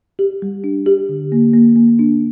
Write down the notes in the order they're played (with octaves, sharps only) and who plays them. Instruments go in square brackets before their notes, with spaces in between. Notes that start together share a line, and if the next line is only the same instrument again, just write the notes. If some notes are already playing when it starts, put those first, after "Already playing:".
[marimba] G4
G3
D4
G4
D3
A#3
A#3
A#3
D4